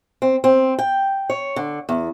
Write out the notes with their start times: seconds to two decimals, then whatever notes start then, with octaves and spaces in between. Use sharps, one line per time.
0.22 C4
0.44 C4
0.79 G5
1.30 C#5
1.56 D3
1.89 E2